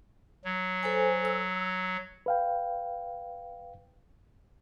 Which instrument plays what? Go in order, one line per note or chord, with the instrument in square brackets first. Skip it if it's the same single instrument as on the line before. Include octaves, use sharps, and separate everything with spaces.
[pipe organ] F#3
[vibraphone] A4 C5 G#5
E6
[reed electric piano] B4 F5 G5